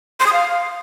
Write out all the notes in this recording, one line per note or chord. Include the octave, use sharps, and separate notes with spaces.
C6
D#6
F5